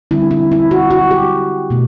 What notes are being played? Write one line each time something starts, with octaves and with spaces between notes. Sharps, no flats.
D3 G3 C4 E4
E4
E4
F#4
F#4
G4
B2 A3